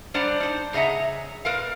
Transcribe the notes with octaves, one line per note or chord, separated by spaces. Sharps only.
G3 D4 C5 D5 F#5 A#5
D#4 C5
C#3 G#4 D#5 E5 F#5 A#5
A#2 A#4 B4 F5